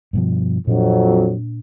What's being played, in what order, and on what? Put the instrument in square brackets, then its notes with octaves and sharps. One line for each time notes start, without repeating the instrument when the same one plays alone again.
[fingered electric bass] G2 B2 F3
[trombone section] F2 F#3 [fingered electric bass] A#2 D4